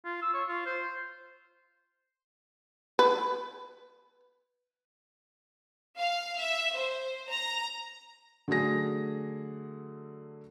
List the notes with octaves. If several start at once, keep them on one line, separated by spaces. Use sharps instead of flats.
F4
E6
C#5
F4
C5
B4
F5
E5
C5
A#5
D3 F#3 A3 G#4 A#6